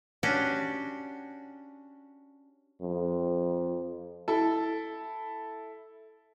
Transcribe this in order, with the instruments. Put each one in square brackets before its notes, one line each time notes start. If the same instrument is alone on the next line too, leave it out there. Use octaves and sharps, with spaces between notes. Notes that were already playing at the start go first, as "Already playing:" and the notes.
[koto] C#4 D4 F#4 G4
[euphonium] F2
[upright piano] E4 A4